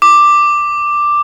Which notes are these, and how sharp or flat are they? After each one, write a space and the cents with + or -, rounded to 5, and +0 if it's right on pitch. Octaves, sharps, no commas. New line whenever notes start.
D6 +5